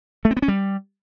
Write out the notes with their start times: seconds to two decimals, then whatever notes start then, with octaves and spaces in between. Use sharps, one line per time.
0.25 A3
0.31 C4
0.37 B3
0.42 C#4
0.48 G3